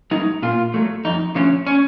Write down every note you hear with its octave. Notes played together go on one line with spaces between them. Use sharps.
F#3 A3 D#4
A#2 F4
F#3 A3
F2 D#4
D3 F3 A3 C#4
C#4